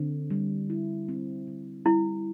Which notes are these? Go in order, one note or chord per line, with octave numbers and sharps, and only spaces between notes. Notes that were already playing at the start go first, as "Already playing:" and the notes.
Already playing: D3 C4
G3
E4
C4
D3
G3 E4